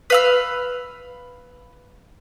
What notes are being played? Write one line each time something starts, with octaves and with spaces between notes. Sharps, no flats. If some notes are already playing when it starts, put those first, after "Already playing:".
B4 F5 E6